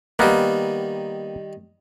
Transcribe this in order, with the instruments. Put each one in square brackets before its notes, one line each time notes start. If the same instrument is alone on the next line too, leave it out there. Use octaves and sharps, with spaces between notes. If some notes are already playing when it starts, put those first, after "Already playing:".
[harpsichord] D#3 G3 [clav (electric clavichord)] A#3 B3